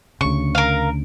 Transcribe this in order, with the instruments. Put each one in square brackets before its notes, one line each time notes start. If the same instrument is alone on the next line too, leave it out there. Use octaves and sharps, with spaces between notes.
[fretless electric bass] D2 C#3 [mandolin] C#6
[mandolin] A#4 F5